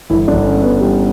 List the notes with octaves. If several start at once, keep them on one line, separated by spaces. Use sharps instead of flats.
G1 E3 E4
D3 D4
G1
C#4
G2
B3
E3 G3 G4